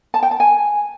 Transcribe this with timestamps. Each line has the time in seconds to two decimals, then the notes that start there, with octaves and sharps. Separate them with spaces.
0.14 A5
0.23 G5
0.31 A5
0.40 G#5